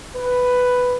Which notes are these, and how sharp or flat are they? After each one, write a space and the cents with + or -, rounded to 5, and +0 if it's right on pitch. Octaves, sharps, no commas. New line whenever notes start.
B4 +5